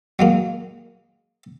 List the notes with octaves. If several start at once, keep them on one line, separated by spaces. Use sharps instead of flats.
F#3 G#3 A#3